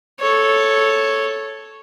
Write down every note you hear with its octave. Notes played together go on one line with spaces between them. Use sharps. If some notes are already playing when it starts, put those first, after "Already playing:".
A4 C#5